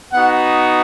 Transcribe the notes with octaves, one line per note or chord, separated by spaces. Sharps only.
B3 D#4 F#4 F#5